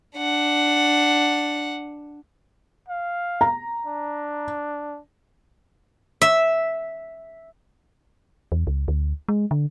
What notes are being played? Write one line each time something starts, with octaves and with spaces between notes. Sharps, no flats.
D4 F#5
F5
A#5
D4
E5
E2
C#2
D2
G#3
D3